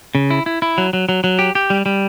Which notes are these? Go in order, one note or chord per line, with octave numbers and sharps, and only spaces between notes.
C#3
E4
E4
E4
F#3
F#3
F#3
F#3
G4
G4
G3
G3